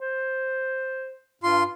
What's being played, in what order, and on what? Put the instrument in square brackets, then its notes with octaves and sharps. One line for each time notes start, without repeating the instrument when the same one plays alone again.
[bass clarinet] C5
[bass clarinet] G2 [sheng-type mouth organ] F4 C6